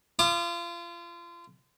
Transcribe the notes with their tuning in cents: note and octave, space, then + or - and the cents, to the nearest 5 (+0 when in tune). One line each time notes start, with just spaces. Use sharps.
F4 -30 D6 +45